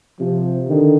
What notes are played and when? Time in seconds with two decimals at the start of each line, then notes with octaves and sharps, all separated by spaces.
0.20 C3 F3
0.68 D3 D#3